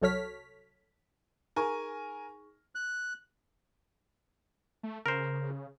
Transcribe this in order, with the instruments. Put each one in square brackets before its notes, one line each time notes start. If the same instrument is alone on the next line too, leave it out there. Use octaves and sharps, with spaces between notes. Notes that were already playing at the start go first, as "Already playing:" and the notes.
[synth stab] C2 F#3 A4 C#5 F6 B6
[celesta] D#4 G#4 C#6 [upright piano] A#4 G#5
[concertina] F#6
[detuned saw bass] A3
[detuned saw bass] C#3 [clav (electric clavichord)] A#4 C5